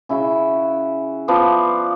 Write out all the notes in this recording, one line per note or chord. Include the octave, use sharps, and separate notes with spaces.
C#3 E4 F#4
F3 B3 D5